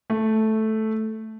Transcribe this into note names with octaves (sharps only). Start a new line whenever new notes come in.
A3